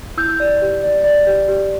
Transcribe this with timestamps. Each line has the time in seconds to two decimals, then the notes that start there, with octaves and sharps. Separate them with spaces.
0.17 E4 E6 G6
0.40 D5
0.62 G4
0.83 D5
1.04 D5
1.27 G4
1.48 G4